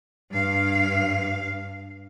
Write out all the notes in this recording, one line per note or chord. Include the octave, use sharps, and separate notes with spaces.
G2 F5